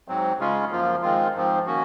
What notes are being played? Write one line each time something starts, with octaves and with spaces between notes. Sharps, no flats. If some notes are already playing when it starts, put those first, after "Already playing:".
G#2 F#3 C4
C#3 G#3 C#4 F4
F#2 F3 A#3 F4
D#3 G#3 C4 F4
G#2 F3 C4
D#3 A#3 C#4 F#4